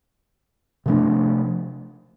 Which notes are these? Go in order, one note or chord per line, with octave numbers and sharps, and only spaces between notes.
C3 F3 A3 D4